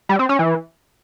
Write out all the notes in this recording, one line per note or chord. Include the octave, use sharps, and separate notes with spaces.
G3
C4
C#4
E3